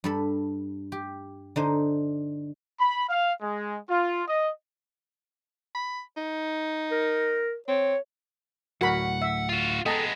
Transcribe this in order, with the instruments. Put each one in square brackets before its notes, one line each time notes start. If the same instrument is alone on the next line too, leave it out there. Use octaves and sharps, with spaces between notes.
[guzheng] G2 A4 B5
G4
D3 D#4 C5
[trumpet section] B5
F5
G#3
F4
D#5
[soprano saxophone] B5
D#4
[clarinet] A#4
[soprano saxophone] C4 [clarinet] C#5
[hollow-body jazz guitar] D2 A2 F#3 [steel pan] F#4 A#4 B5 [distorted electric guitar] F#5
[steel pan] E5
[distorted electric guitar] F4 F#4
[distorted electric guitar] G#3 B3 [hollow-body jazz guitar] A4 G5 [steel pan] D#5 A5 A#5